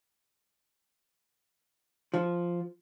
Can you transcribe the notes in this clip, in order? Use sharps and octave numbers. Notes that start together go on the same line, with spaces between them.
F3